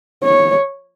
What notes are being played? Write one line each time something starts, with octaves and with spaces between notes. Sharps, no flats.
C#5